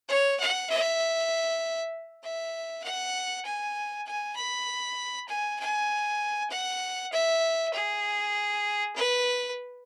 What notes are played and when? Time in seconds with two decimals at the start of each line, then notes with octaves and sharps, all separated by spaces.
0.09 C#5
0.40 F#5
0.70 E5
2.23 E5
2.84 F#5
3.45 G#5
4.07 G#5
4.36 B5
5.28 G#5
5.60 G#5
6.50 F#5
7.12 E5
7.74 G#4
8.96 B4